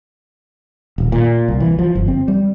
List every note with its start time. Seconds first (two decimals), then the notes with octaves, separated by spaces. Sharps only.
0.98 D#1
1.12 A#2
1.48 C2
1.60 E3
1.79 F3
1.95 G1
2.08 C4
2.28 G3